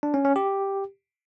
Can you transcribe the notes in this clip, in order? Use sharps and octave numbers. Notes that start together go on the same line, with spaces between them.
D4
C#4
C#4
G4